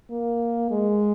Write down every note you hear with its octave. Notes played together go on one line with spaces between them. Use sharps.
A#3
G#3